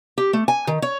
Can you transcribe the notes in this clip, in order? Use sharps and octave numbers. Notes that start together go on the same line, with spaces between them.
G4
A3
G#5
D#3
C#5